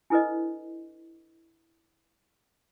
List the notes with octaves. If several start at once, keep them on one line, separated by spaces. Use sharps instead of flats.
D4 E4 A4 B4 C5 D#5